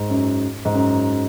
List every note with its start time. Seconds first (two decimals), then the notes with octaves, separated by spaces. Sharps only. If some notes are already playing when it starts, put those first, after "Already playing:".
Already playing: G#2
0.10 F#2
0.65 G#2
0.74 F#2